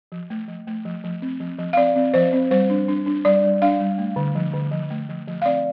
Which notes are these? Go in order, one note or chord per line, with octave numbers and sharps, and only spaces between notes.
F3
A3
F3
A3
F3
F3
C4
F3
F3
F5
C4 D5
C4
F3 C5
C4
G3 C5
D4
D4
D4
G3 D5
G3
D4 F5
G3
A3
D3
F3
D3
F3
A3
F3
F3
F5
C4 D5